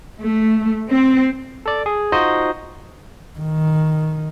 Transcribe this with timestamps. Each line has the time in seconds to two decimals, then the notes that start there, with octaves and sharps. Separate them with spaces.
0.21 A3
0.90 C4
1.66 A4 D5
1.86 G#4
2.12 D#4 F4 F#4 C5 D#5
3.39 D#3